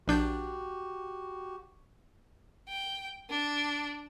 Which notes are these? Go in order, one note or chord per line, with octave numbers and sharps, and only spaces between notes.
A#1 D4 F#4 G4 G6
G5
D4